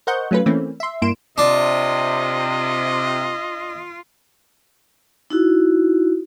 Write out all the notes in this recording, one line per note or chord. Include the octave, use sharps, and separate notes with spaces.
A#4 C5 D#5 F#5 C#6 G6
F#3 A3 C#4 F4 B4
E3 A3 A#3 C4 C#4
E5 C6
G2 A#3 E4 C6 D7 E7
C3 D4 F4 D#5
D#4 E4 F#4